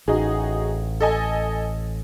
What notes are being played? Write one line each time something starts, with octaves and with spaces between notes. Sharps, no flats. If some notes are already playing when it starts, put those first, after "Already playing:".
A1 D#4 F#4 G#4
A4 D#5 G#5